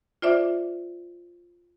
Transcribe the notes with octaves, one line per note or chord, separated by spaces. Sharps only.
F4 C5 D5 E5 D6